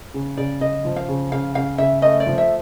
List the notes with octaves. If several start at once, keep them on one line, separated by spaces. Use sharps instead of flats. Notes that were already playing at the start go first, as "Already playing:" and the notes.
C#3
C#3 D5
C#3 D#5
F3
F5
C#3
C#3 F5
C#3 F5
C#3 E5
A3 D#5
D5
F3
E5